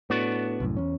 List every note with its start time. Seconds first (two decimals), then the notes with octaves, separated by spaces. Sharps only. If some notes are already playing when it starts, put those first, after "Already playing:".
0.10 A2 B3 D4 F#4
0.60 C2 F#2 A2
0.77 E2 C#4